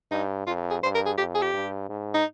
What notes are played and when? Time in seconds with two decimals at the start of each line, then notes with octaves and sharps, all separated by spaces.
0.11 G2 D#4
0.47 F2 F4
0.70 G#4
0.82 G2 C5
0.95 A#4
1.06 G#4
1.18 F2 G4
1.35 G#4
1.42 G4
1.54 G2
1.89 G#2
2.14 D#4